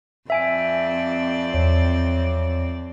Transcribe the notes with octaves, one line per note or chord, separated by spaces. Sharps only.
F2 C4 D5 E5 G#5 D7
E2 C#5